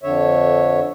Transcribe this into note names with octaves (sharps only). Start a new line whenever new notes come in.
F2 D3 C#5 E5